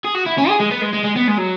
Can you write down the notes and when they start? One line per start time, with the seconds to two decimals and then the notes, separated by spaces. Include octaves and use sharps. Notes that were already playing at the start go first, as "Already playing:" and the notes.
0.04 G#4
0.15 F#4
0.26 E4
0.38 C#4
0.49 G#4
0.60 G#3
0.71 B3
0.82 G#3
0.93 G#3
1.04 G#3
1.16 B3
1.28 G#3
1.38 F#3